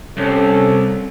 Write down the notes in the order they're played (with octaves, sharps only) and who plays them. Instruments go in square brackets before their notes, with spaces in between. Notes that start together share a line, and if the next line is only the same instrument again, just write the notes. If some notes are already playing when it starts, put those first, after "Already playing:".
[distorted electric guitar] C2 [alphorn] C#4 [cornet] A4